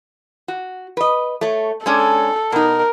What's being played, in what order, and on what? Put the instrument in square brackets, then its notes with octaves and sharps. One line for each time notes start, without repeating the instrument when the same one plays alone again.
[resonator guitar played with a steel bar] F#4
B4 D#5
A3 C#5
[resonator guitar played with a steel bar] G#3 C#4 D4 [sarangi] A4
[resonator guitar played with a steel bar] B2 D#4 [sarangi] A#4